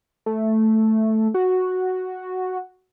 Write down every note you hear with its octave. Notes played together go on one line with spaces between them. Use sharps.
A3
F#4